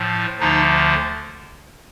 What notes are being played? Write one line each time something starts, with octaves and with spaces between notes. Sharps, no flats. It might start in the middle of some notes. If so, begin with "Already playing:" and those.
Already playing: A2 F3
D2 D3 F3 D#4